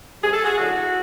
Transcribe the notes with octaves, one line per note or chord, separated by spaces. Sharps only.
C3 D#3 G3 G#4
A4
F#4 G#4
F#2 D3 F#3 A3 E4 F#4